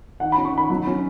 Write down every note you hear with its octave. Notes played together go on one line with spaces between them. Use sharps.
D#3 F#5
C#4 B5
C#6
D#3 B5
F#3
C#4